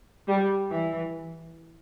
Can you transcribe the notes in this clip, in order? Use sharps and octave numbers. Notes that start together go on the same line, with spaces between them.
G3
E3